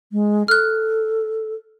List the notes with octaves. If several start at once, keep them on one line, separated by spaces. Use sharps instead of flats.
G#3
A4 F6 F#6